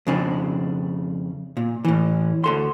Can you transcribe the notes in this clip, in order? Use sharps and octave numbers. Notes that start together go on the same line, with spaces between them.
F2 C#3 D4
A#2
A2 E3
D2 A4 C6